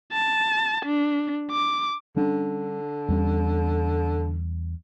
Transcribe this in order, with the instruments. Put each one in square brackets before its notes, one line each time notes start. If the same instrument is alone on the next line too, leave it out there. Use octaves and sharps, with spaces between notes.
[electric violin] A5
D4
D6
[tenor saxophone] D3 [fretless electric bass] G3 C#4 D4
[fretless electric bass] E2 G3 C#4